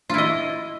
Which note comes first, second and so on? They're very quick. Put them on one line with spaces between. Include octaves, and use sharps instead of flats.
F4 E4 D#5